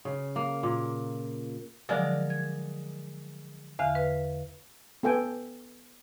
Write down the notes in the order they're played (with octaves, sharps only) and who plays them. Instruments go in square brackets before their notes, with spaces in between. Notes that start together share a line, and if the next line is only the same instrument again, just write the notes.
[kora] C#3
A#3
A#2
[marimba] D3 F3 F#3 [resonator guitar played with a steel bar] G#3 A#4 D5
[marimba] G#6
[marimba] E2 D3 E5 [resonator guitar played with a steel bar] F5
[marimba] B4
[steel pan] B3 A4 G5 G#5